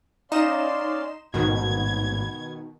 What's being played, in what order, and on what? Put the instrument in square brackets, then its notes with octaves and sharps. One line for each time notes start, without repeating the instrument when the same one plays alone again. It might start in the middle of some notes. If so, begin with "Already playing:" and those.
[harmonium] C#4 D5 F5 [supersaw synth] D#4 D#5 E7 [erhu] C6
[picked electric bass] A1 G#2 [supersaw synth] B2 D#3 [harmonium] B3 [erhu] G#6